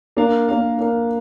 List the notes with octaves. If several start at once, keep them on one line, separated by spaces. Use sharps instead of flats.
A#3 D4 A#4 F5
A#3 D4 A#4 F5
A#3 D4 A#4 F5